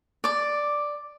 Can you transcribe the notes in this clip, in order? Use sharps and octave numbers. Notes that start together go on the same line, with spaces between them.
D5 D6